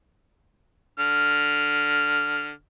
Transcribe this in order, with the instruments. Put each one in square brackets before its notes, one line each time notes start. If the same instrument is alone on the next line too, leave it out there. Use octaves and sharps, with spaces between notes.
[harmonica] D3 F6